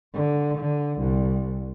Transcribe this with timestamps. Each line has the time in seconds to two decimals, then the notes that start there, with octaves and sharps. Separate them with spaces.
0.14 D3
0.57 D3
0.99 C2